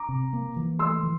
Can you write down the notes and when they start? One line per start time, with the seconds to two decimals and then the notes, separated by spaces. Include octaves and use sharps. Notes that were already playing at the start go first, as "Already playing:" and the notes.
Already playing: A#5 D6
0.09 C3
0.33 A#3
0.56 E3
0.79 A3 C6 E6
1.03 E3